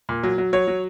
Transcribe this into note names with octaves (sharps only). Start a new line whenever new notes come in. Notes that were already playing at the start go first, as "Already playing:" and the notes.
A#2
F#3
F#3
F#3 C#5
F#3